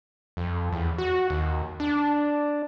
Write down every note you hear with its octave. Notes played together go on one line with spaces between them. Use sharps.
F2
E2
F#4
D#2
D4